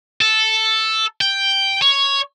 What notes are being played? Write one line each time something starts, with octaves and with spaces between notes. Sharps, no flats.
A4
G5
C#5